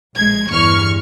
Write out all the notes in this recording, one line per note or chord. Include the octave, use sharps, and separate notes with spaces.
A#1 G#3 G#6
G1 E2 C#6 F6